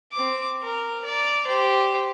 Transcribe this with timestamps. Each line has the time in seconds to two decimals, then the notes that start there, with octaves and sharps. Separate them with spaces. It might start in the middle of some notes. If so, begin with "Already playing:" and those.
0.13 C4 D6
0.63 A#4
1.05 D5 A#5
1.47 G4 C5